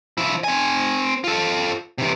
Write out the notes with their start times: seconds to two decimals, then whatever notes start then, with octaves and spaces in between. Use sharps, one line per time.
0.18 F3 E4
0.44 C4 G#5
1.24 F4 A4
1.98 C3 E3